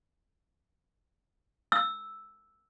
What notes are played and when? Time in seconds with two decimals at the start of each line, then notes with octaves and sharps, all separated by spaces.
1.72 E6